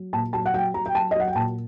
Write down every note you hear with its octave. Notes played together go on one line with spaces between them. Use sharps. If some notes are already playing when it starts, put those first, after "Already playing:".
Already playing: F#3
A#2 A5
F#3 A5
F#5
F#3 G5
F#3 A#5
G5
F#3 A5
D#5
F#3 F#5
G5
A#2 A5